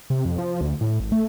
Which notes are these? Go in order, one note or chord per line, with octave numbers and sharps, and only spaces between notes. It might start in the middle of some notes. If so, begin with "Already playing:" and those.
C3
F2
F3
D2
A2
G#1
A3